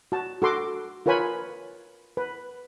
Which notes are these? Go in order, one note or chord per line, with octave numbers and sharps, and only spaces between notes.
F#4 A5
F#4 A4 C6 D6
F4 A#4 B4 C#5 G#5 B5
B4